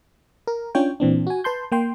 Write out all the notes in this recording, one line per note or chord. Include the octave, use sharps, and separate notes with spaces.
A#4
C#4 D4 F4 C#5 G5
A#2 E3 C4 D4
F#4 G#5
B4 A5 C6 G6
A#3 G5 C6